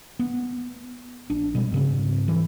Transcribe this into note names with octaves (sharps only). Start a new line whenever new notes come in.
B3
A#1 D4
B2 G3 G#3 C4
G#2 C#3 G3 C4
E3